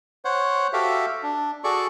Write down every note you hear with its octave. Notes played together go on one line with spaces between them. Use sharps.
C5 C#5 F#5
F#4 G4 A4 E5 F5
D4
F#4 G#4 A4 D5 C#6